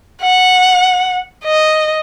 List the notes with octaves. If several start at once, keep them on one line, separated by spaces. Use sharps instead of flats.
F#5
D#5